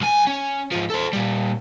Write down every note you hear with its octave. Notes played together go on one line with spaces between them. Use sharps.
B1 G#5
C#4
G#2 F3
A4 C5
A#2 G3